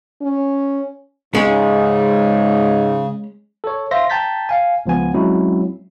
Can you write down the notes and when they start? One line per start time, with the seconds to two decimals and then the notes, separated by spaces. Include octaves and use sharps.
0.21 C#4
1.35 G#2 C#3 G#3 C#4
3.64 A4 C#5
3.91 C5 E5 F5 C6 A#6
4.10 G5 A5 A#5 G6 A6 B6
4.49 F5 G#5
4.86 C#2 F3 B3 G#5
5.14 F#3 G#3 C4 C#4 E4